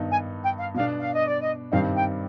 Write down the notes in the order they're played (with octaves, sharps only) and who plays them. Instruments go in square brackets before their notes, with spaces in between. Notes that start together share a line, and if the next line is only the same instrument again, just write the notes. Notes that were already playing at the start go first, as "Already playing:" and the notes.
Already playing: [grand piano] G2 D#3 B3 D#4
[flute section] G#5
G5
F5
[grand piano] B2 B3 D4 [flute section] F5
[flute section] F5
D#5
D5
D#5
[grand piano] G2 D#3 G3 C4 D#4 [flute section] F5
[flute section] G5